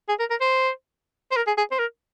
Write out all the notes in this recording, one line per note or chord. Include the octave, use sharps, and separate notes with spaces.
G#4
A#4
A#4
C5
C5
A#4
G#4
G#4
C5
A#4